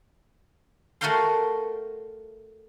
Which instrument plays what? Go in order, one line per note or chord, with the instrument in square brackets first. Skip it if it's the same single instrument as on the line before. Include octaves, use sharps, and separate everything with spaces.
[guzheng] A3 F#4 A#4 F5 G5 C6